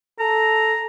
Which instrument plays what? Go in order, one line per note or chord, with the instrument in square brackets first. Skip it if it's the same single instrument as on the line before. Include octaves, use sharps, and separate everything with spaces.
[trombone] A4 [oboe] A#5